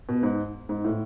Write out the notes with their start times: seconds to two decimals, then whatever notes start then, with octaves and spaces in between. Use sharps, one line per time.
0.09 B2
0.23 G#2
0.69 G#2
0.84 A2